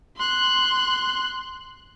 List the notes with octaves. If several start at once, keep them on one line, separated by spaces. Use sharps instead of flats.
C6 F#6